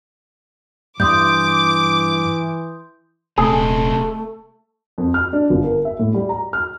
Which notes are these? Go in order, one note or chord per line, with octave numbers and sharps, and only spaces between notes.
G2 E3 C6 D6 D#6 G6
D#1 C3 G#3 A3 G#4
F2
F6
D4
G1
A#4
E5
A2
G3
A#5
F6